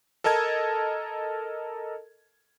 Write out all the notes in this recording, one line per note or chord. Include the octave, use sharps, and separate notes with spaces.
A4 A#4 D#5 A5 G#6